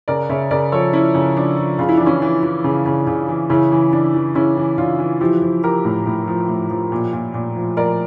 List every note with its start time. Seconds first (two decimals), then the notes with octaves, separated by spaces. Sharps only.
0.08 C#3 A#4 D5
0.29 C#3 C#5 E5
0.51 C#3 A#4 D5
0.72 F3 A4 C#5
0.93 F3 C#4 E4
1.15 C#3
1.36 F3 D4
1.58 F3
1.79 C#3 F4
1.89 E4
1.97 E3 D4
2.06 C#4 E4
2.22 E3
2.43 E3
2.64 C#3
2.86 C#3
3.07 C#3
3.28 E3
3.50 C#3 C#4 E4
3.71 E3
3.93 E3 D4
4.14 E3
4.35 C#3 C#4 E4
4.57 E3
4.78 C#3 D4 F4
4.99 E3
5.21 F3 E4 G4
5.42 F3
5.63 F3 G4 A#4
5.85 A2
6.06 A2
6.27 F3
6.49 A2
6.70 F3
6.92 A#2
7.13 A#2
7.34 A#2
7.56 F3
7.77 F3 A#4 D5